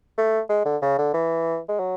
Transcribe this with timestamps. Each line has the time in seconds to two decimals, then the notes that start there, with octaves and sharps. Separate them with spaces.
0.17 A3
0.49 G#3
0.65 D3
0.82 C#3
0.98 D3
1.14 E3
1.68 G#3
1.79 F#3